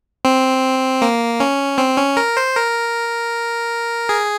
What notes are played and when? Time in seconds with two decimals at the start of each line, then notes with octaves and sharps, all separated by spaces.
0.25 C4
1.02 A#3
1.40 C#4
1.78 C4
1.98 C#4
2.17 A#4
2.37 C5
2.55 A#4
4.09 G#4